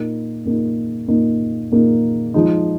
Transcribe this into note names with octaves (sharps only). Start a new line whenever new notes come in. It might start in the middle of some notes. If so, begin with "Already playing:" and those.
Already playing: A#2 A#3 D#4
A#2 A#3 D#4
A#2 A#3 D#4
A#2 A#3 D#4
F3 G#3 D#4